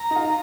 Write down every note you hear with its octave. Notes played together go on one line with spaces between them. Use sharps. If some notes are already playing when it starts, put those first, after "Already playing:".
Already playing: A#5
D#4
F4